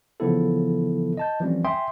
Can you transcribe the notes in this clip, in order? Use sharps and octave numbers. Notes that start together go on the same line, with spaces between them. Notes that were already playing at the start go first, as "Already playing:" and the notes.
C#3 E3 F3 B3 E4 A4
D#5 A5 G6
E3 F3 G3 A3 C4 C#4
E5 G5 G#5 C6 D#6